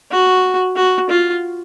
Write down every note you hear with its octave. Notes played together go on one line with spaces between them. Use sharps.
F#4
F#4
F4